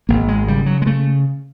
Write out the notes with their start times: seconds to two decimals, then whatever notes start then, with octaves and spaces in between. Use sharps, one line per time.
0.09 G#1 A#3
0.28 G#3
0.48 C#3 G3
0.66 F#3
0.82 G#3
0.86 C#3 A3